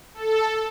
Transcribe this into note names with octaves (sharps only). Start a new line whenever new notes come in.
A4